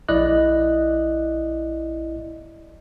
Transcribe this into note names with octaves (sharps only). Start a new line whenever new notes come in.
A#1 E4 D5 D#5 F#6